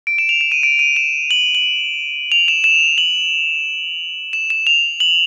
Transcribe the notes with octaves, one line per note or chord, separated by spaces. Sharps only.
D7
E7
F7
E7
D#7
D7
D#7
E7
F#7
F#7
F7
E7
E7
F#7
E7
E7
F7
F#7